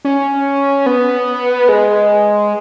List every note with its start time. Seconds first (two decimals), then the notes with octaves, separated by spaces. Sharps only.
0.05 C#4
0.86 B3
1.69 G#3